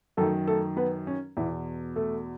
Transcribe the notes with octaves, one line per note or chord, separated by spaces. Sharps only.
F#2 D#3 A3 A4
A3 A4
B3 B4
C#4
E2 B2 E3 E4
A3 A4